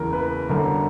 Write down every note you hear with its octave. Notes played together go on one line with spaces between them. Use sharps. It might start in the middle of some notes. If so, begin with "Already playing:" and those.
Already playing: F#1 E2 C#3 E3 A#4
B4
G1 F#2 D3 A#4